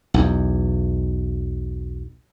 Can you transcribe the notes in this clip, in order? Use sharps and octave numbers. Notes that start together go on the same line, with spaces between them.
B1 E2